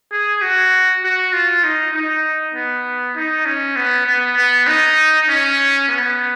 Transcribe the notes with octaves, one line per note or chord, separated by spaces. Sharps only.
G#4
F#4
F#4
F4
D#4
D#4
B3
D#4
C#4
B3
B3
B3
D#4
C#4
B3